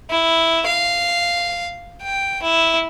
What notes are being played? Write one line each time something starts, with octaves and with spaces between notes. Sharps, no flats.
E4
F5
G5
E4